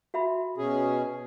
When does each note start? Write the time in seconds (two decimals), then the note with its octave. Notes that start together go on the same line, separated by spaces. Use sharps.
0.14 F#4 E5 B5
0.58 B2 C#4 G#4